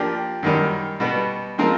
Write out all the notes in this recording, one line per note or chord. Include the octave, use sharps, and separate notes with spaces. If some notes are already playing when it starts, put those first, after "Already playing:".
Already playing: F3 A#3 D4 G4
F#2 D#3 G3
B2 G3 B3
F3 G#3 C4 F4 A#4